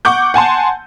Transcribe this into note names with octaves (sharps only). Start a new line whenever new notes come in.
F#5 C#6 D6 G6
F#5 G#5 A5 C6